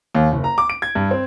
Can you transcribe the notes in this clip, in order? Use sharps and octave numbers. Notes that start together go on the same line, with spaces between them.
D#2
F#1
A#5
D6
D7
G#6
G2
C4